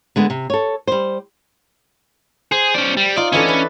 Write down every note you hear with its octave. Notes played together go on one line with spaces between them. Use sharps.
D3 G#3 B3
C3
A4 C#5
G3 C5
G#4 C5
C#4 D5
G3
D#4 F4 D5
E3 A3 C#4 D4
B4